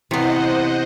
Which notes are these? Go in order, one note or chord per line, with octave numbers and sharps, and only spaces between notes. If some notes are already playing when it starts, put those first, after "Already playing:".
C3 E3 B3 C5 C#5 D#5 F#5